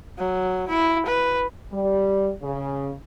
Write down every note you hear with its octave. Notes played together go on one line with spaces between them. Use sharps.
F#3
E4
B4
G3
C#3